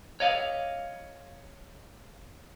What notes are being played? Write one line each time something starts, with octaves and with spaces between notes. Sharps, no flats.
C#5 D#5 F5